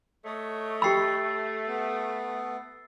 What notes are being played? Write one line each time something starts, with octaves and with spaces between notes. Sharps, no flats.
A3 C#5 D#5
G4 G5 B5 E6 A6 C7
B3